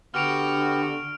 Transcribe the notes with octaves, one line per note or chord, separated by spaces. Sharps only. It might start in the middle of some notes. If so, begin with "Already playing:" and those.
D3 B3 F#4 G4 F6 D7 F7